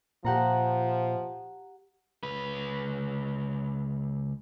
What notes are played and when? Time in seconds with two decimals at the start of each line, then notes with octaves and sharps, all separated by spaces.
0.25 A#2 F3 G4 F#5 A#5
2.23 C#2 B4